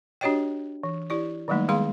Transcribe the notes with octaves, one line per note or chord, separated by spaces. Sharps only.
D4 F#4 G4 C#5 D#5 G5
E3
E4 G4 D5
D#3 F#3 G3 A3 A#3 D#4
D#3 G#3 B3 G#4 F5 C6